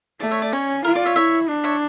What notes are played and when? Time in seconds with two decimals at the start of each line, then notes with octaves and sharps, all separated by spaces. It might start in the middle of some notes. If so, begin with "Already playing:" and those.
0.20 A3 D5
0.31 C#5 E5
0.42 D5
0.52 C#4 C#5
0.84 F4 A#4
0.95 D5
1.05 C#5 E5
1.16 E4 C#5 E5
1.49 D4
1.64 C#5 E5